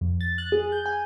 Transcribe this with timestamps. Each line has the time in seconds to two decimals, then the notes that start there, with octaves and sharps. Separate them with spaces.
0.01 F2
0.21 A6
0.38 F#6
0.52 G#4
0.72 G6
0.86 G#5